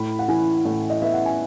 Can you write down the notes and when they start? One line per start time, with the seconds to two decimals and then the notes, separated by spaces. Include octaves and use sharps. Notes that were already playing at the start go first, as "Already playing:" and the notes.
Already playing: A2 B5
0.19 F#5
0.29 E3 G#5
0.65 A2
0.90 D#5
1.02 B3 E5
1.14 F#5
1.25 G#5